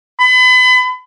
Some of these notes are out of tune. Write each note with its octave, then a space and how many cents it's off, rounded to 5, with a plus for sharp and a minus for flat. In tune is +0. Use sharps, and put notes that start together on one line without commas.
B5 +35